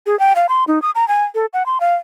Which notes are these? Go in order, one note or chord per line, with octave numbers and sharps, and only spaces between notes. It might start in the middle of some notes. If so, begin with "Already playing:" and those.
G#4
G5
F5
C6
D#4
D#6
A#5
G#5
A4
F#5
C6
F5